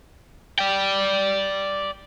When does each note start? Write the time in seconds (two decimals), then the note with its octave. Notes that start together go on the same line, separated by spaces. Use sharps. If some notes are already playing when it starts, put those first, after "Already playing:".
0.59 D5 G5